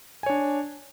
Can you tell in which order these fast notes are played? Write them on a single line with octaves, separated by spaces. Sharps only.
G#5 C#5 D4